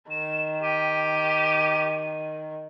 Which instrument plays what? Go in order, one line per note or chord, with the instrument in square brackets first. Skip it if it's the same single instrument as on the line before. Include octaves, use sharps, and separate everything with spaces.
[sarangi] D#3 [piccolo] E7
[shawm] G4 [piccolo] D#7